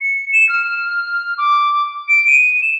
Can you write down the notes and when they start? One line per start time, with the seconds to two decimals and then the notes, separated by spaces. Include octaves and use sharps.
0.01 C#7
0.32 E7
0.49 F6
1.38 D6
2.08 D7
2.27 D#7
2.62 E7